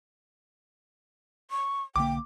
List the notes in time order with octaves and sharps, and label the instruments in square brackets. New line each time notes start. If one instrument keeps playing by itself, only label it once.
[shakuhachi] C#6
[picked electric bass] B1 D3 A#3 [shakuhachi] G5 [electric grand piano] D6